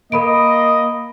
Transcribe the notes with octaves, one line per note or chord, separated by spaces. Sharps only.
A#3 A#4 D#5 B5 D7